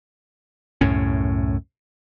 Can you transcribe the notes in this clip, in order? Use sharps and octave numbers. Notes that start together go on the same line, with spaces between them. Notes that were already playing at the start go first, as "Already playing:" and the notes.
C2 F#2 A2 C#4